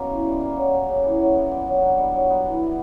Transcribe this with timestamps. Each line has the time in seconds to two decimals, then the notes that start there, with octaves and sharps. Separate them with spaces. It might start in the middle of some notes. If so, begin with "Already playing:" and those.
Already playing: F#2 B2 A#3
0.10 E3
0.26 G3
0.41 A#3
0.56 F#3
0.72 C#4
0.88 C#3
1.04 E3
1.19 F#3
1.35 B3
1.51 A#2
1.67 F#3
1.82 D3
1.98 G3
2.14 F#3
2.30 B3
2.46 E3
2.61 B3